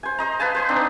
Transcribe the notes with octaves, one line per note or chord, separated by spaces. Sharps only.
C5 G#5
C5 D#5 A#5
B4 F5 G#5 A5
B4 C5
C4 D4 D#4